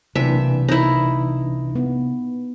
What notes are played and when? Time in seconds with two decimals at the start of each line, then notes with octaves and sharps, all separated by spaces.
0.15 B1 C3 E3 A#3 D4 E5
0.69 D#4 E4
1.75 B3